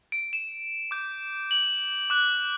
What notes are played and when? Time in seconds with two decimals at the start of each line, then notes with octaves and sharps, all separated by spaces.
0.12 D7
0.33 E7
0.91 D6 G6
1.51 F#7
2.10 D6 F#6